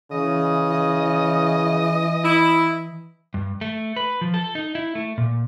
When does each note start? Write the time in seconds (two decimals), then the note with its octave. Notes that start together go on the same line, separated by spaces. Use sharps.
0.12 C#3 E3 D#5
2.23 E4
3.34 G2
3.61 A3
3.96 B4
4.21 F3
4.34 A4
4.55 D#4
4.75 E4
4.95 A3
5.18 A#2